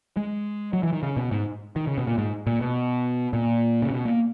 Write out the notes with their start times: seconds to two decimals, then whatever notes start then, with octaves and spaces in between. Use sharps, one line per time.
0.17 G#3
0.73 F#3
0.83 E3
0.93 D#3
1.03 C#3
1.17 B2
1.31 G#2
1.76 D#3
1.87 C#3
1.98 B2
2.07 A#2
2.18 G#2
2.47 A#2
2.61 B2
3.33 A#2
3.82 C#3
3.91 B2
4.05 A#3